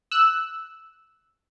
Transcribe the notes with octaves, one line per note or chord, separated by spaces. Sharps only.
E6 F#6